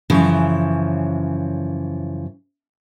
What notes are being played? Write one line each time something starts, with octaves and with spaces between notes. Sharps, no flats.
F#2 C#3 E3 F3